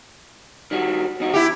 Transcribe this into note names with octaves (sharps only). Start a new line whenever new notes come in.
D#3 G3 F#4
E2 D#4 F#4
E2 E4 G4